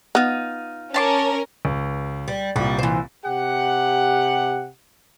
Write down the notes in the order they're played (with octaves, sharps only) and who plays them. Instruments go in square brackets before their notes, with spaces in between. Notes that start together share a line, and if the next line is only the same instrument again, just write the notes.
[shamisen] B3 [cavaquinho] D#4 F4
[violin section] C#4 A#4 [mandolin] A5 C6 D6
[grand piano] C#2
[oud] G3
[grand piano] C2 A#2 [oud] G3
[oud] E3 C5
[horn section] C3 G4 F#5